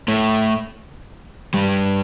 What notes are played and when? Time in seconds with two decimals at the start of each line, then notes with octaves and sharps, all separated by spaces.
0.08 A2 A3
1.54 G2 G3